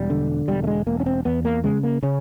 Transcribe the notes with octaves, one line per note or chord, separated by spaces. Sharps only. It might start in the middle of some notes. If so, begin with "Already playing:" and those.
Already playing: E1 G3
D3
E1 G3
A3
G#3
E1 A#3
C#4
C4
E2 B3
A#3
C#3 G#3
A#3
C#3 C#4